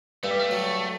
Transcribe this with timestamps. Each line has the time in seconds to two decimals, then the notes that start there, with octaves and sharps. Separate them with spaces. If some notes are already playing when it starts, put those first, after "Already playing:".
0.24 G2 A3
0.31 G3
0.39 A3
0.51 F#3